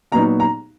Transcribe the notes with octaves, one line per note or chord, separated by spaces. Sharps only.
A#2 F#3 B3 D#4 A#5
A#5